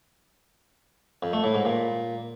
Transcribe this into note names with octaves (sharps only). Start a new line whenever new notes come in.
F2
A3
A2
G#2
A#2